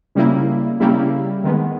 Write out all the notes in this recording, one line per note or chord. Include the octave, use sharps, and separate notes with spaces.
C#3 G3 A#3 E4
C#3 G3 A#3 E4
D#3 G#3 B3